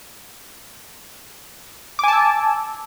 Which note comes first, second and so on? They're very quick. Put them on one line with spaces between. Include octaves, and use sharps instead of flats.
D6 G#5 A5 E6